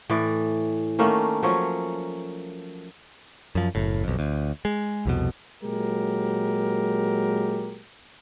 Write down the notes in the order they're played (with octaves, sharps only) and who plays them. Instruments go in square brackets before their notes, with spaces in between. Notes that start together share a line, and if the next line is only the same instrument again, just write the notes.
[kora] A2 E3 D5
D#3 A3 A#3 C#4
F3 F#3 C#4 C#5
[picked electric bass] F#2 F3
F#1 A2
B1 F2
D2
G#3
C2 F2 B2
[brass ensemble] A#2 F#3 G#3 G4 A#4